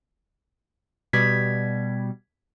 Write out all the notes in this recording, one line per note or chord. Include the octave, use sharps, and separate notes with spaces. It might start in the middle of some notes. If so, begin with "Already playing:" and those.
B2 G3 G#6 B6